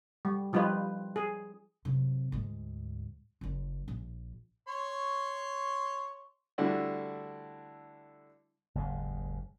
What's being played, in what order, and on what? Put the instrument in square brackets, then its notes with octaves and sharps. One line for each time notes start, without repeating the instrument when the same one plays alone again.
[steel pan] G3
F3 G3 D#4 F4 B4
G#4
[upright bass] F#2 C3
D2 G#2
F#1 F#2
A#1
[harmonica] C#5 C6 C#6
[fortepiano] D3 G3 A3 D4 E4 F#4
[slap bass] F#1 D#2 G#2